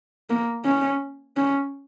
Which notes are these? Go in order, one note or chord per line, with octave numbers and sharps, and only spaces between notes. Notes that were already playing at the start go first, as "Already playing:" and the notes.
A#3
C#4
C#4